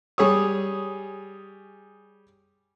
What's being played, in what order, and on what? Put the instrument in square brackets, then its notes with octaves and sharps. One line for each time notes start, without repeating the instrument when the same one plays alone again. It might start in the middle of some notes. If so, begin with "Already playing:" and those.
[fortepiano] G3 G#4 C#5 C#6 D#6